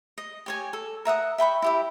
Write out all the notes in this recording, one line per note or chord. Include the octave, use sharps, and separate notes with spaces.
D#5
G4 C#5 G#5
A4
A#4 E5 F#5 D#6
E5 G5 B5 C#6
E4 G4 E5